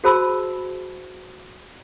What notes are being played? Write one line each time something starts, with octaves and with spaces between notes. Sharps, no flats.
F#4 G#4 C5 A5 B5 E6